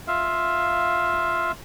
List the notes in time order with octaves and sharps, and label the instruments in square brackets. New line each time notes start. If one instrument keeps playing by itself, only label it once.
[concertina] F4 E5 F5